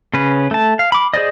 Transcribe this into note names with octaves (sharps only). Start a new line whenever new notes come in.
C#3 C#4 B4
A3 A5
F5
B5 D6
G#4 C5 D5 D#5